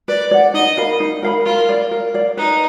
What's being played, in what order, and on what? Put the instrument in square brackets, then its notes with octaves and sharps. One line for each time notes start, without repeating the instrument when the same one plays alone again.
[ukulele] B4 [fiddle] D5
[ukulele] D5 F#5
[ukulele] D#4 [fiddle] D#5
[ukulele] A#4 F5 B5
D#4
A#4 F5 B5
[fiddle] F4 [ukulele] A#4
[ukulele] D5 F5
A#4
D5 F5
[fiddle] D#4 [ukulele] B4